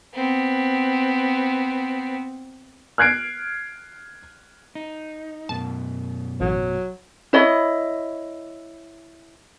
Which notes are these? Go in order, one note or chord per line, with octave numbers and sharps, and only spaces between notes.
B3 C4
F6 F#6 G#6 C7 D7
D#4
F#2 B2 A5
A1 F#3
E4 C#5 D#5 B5